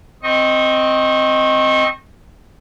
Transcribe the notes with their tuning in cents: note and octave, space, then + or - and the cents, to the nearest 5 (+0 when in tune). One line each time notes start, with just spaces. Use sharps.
C4 +0 D#5 +0 C#6 -30